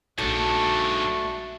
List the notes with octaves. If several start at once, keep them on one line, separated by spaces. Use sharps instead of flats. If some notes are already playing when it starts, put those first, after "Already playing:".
A#1 G#2 D3 A3 D4 F#4 A5